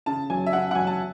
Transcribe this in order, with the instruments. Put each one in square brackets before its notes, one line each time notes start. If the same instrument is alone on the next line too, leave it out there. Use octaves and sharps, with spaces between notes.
[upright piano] C#3 A5
F#3 G#5
E5
C#3 F#5
F#5
F#3 G#5
A5